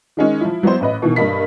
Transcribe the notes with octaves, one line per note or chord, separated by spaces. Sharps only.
D#3 G#3 C#4 D#4
F3 E4
F#3 B3 E4 C5
A1 B4 D#5
B2 D#3 E3
G2 A#3 D#5 B5 B6